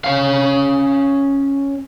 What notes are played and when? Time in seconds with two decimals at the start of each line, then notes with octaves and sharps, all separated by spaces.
0.04 C#4 F5